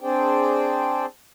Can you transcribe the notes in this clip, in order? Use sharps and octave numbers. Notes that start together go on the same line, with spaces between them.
C4 D4 G#4 C5 D5 G5